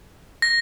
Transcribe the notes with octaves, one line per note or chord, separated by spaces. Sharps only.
A#6